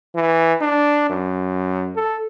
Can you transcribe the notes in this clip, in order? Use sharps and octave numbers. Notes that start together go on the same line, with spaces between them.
E3
D4
F#2
A4